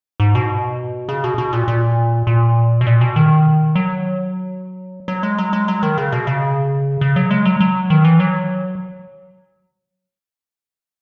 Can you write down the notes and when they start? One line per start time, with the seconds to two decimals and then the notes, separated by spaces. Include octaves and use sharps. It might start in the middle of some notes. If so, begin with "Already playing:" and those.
0.20 G#2
0.35 B2
1.09 C#3
1.24 B2
1.38 B2
1.53 A#2
1.68 A#2
2.27 A#2
2.81 B2
2.87 A#2
3.01 B2
3.16 D#3
3.75 F#3
5.08 F#3
5.23 G#3
5.38 F#3
5.53 G#3
5.68 F#3
5.83 D#3
5.97 C#3
6.12 B2
6.27 C#3
7.01 C#3
7.16 F#3
7.31 G#3
7.45 F#3
7.60 F#3
7.90 D#3
8.05 E3
8.20 F#3